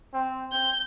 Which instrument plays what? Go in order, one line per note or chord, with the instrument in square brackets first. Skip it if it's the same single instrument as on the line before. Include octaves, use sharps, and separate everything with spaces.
[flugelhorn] C4
[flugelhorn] C4 [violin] G6